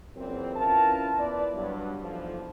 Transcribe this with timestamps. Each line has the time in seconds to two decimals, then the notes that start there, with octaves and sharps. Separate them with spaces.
0.17 F#2 A#2 C#3 E3 B3 C4
0.56 C#4 E4 F4 A#4 B4 A5
1.19 B3 E4 B4 D5
1.54 G2 F#3
2.01 B1 G2 D3 E3 F3